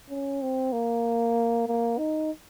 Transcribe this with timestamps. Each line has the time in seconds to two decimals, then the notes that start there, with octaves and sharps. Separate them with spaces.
0.10 C#4
0.42 C4
0.73 A#3
1.68 A#3
1.98 D#4